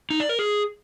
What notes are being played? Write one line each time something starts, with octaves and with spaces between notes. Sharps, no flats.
D#4
D5
A#4
G#4